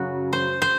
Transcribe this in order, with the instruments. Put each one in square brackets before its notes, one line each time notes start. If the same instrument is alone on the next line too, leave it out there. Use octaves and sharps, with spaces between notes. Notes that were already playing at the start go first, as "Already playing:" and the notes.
Already playing: [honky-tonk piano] F#2 C#3 F#3 [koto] F#4
[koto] C5
C5